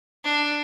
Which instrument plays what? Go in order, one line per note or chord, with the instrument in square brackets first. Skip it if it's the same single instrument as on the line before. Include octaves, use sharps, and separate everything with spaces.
[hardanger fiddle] D4